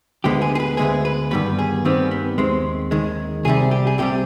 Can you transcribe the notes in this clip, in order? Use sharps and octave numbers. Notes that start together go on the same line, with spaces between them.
D2 D3 G#3 B3 G4
G#4
G#4
B4
D2 D3 G#3 B3 G#4
B4
G2 D#3 G3 B3 B4
G#4
G2 D#3 G3 B3 C4
B3
D#2 D#3 G#3 C4
D#2 D#3 G#3
C2 C3 G3 G#4
G4
G#4
C2 C3 G3 G4